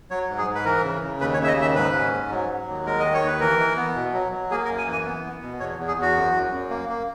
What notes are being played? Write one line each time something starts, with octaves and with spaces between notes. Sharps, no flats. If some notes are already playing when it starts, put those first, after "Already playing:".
F#3 C#5
G#2
G#4
G#2
B4
E3 A#4
C#3
C#3
D#2 B4
C#5
C#3
E5
D#5
D#2 E5
G#2 B4
C#4
G#2
F#3
F#3
D#2
G#3 A#4
D#3 D#5
C#5
D#2
B4
E3 A#4
E3
B3
B2
F#3
F#3
A#3 G#4
A#4
F#2
G#5
E3
G#5
B3
B3
B2
E2 C#5
E2
G#4
E2 F#4
F#2
F#2
F#2
A#3
A#3